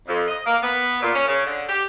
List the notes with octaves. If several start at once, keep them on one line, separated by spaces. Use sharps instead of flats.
F2
D#5
A#3
B3
A#2
C#4
C#3
D3
G4